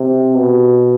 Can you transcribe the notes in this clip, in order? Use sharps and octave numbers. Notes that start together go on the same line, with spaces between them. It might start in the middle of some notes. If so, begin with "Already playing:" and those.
Already playing: C3
B2